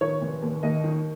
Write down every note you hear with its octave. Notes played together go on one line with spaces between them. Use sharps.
D#3 C#5
F1
D#2
D#2 D#5
D#3